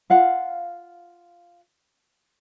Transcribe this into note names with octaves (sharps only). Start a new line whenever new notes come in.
F4 F5 F#5